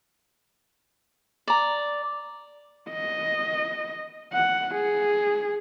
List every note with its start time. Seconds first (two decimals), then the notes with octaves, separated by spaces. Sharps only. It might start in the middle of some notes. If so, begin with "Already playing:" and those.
1.48 D5 A#5
2.91 D#5
4.33 F#5
4.75 G#4